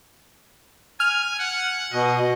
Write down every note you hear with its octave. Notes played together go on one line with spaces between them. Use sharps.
G#5 F6
F#5
B2 D#5